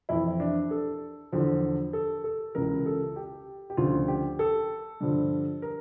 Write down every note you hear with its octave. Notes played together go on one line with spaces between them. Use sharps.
F2 E3 E4
D4
A4
E2 D3 F3
A4
A4
C#2 C#3 E3 A#4
A4
G4
G4
D2 C#3 F3 F4
G4
A4
G2 D3 F3
A#4